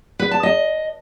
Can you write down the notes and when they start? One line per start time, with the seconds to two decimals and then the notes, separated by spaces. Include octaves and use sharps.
0.19 B4
0.31 A5
0.43 D#5